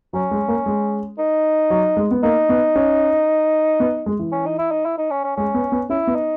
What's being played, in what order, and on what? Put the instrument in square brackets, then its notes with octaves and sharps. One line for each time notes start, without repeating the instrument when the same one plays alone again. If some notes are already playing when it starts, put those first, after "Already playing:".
[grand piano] F#3 [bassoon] C#4
[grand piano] G#3
A#3
G#3
[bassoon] D#4
[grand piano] F#3
G#3
B3
[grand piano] A#3 [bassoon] D#4
[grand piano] B3
C#4
B3
G#3
E3
[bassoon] C#4
D#4
E4
D#4
E4
D#4
C#4
C#4
[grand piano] G#3 [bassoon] C#4
[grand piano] B3
B3
[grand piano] C#4 [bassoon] E4
[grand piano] B3
[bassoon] D#4